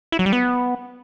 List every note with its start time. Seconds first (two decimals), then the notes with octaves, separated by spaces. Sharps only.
0.12 E4
0.19 F#3
0.26 G3
0.33 B3